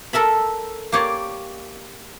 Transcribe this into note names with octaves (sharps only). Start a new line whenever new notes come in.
A4 A#4 E5 B5
A#3 G4 C#5 D5